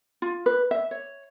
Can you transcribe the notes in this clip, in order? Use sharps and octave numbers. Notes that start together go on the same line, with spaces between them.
F4
B4
E5
C#5